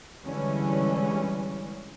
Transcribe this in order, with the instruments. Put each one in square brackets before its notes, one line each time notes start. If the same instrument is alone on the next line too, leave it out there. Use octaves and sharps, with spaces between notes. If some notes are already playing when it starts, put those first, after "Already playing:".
[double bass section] D3 E3 G3 G#3 C#4